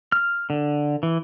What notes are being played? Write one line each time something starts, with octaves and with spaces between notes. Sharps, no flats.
F6
D3
E3